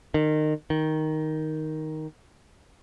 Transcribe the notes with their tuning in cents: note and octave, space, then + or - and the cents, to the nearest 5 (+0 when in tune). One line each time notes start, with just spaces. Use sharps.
D#3 -25
D#3 +5